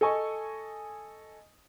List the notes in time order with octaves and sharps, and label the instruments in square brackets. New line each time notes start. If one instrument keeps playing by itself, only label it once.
[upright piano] A4 D#5 G#5 C#6